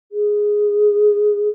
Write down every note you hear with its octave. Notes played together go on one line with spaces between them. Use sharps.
G#4